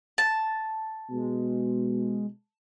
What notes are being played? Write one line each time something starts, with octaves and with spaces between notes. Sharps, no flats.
A5
B2 G#3